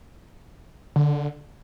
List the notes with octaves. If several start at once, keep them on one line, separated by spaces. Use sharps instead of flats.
D3